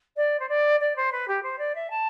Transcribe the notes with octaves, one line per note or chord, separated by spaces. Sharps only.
D5
C5
D5
D5
C5
B4
G4
C5
D5
E5
A5